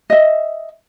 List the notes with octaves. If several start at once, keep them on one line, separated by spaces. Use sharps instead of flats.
D#5 E5